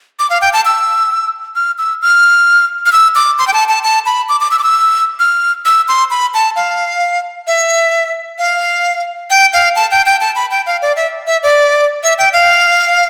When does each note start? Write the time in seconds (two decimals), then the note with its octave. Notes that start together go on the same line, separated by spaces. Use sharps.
0.19 D6
0.30 F5
0.42 G5
0.53 A5
0.65 E6
1.56 F6
1.78 E6
2.02 F6
2.86 F6
2.92 E6
3.15 D6
3.39 C6
3.48 G5
3.53 A5
3.69 A5
3.84 A5
4.06 B5
4.29 D6
4.41 D6
4.51 E6
4.59 D6
4.64 E6
5.19 F6
5.65 E6
5.88 C6
6.11 B5
6.34 A5
6.56 F5
7.47 E5
8.38 F5
9.30 G5
9.53 F5
9.76 A5
9.91 G5
10.06 G5
10.21 A5
10.35 B5
10.51 G5
10.66 F5
10.82 D5
10.96 E5
11.27 E5
11.43 D5
12.03 E5
12.18 G5
12.33 F5